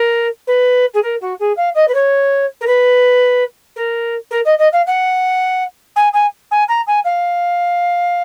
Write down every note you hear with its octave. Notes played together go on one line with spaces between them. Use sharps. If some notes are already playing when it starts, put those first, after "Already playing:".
Already playing: A#4
B4
G#4
A#4
F#4
G#4
F5
D#5
B4
C#5
A#4
B4
A#4
A#4
D#5
D#5
F5
F#5
G#5
G#5
G#5
A#5
G#5
F5